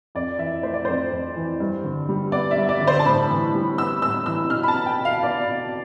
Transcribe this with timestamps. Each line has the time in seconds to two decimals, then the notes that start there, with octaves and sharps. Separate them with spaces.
0.15 F2 D5
0.39 E3 E5
0.63 A3 C5
0.74 D5
0.85 F2 C5
1.12 F2
1.36 E3
1.60 G2
1.84 D3
2.09 G3
2.32 B3 D5
2.51 E5
2.56 G2
2.69 D5
2.81 D3
2.87 C5
2.99 A5
3.05 A2 B5
3.30 E3
3.54 G3
3.78 B3 E6
4.02 A2 E6
4.26 E3 E6
4.50 B2 F6
4.63 B5
4.68 A5
4.74 B3
4.86 G5
4.99 B2
5.05 F5
5.23 B3 D5
5.48 B2